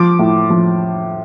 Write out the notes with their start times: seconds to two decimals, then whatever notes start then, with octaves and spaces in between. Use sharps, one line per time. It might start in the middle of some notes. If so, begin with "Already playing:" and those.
Already playing: F3 D6
0.19 A2
0.50 F3